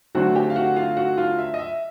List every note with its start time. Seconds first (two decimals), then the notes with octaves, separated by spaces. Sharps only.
0.15 D3 F#3 A3 C4 F#4 F#5
0.35 G4 G5
0.50 F5
0.56 F#4 F#5
0.76 F4 F5
0.97 F#4 F#5
1.18 F4 F5
1.39 E5
1.54 D#5
1.59 E5